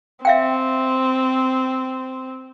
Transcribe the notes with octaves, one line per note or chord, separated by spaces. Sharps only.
C4 E5 F5 G5